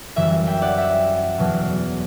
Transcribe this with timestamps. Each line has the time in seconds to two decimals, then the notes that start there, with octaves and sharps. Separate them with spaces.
0.16 F#2 E3 G3 E5
0.31 E5
0.47 E5 G5
0.62 D5 F#5
0.77 E5
1.38 E2 B2 F#3